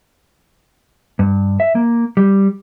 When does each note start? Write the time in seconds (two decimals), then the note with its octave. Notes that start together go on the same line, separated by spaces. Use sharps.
1.19 G2
1.60 E5
1.75 A#3
2.17 G3